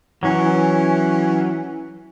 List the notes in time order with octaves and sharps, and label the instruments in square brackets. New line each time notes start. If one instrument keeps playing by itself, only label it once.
[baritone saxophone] E3 [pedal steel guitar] F#3 C#4